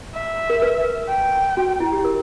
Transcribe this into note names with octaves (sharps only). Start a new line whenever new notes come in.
E5
A#4
B4
G5
F#4
E4
G4
A#4